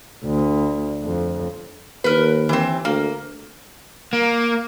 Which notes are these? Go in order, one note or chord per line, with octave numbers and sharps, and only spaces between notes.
D2
F2
D#2 A#4 B4
E3 C4
D2 A#3
A#3